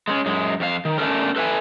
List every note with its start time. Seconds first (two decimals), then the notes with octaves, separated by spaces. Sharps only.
0.08 G#3 A3 C#4
0.26 F#2 G#3
0.60 F2 F4 F5
0.85 D#3
0.98 A3 C#4 D4 A4 A#4
1.36 A4 B4 E5 F#5 G#5